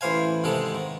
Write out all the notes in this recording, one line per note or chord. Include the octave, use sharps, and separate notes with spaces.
A1 E3 C5 F5 G#5
G#2 C3 D#3 G#3 A4
D#3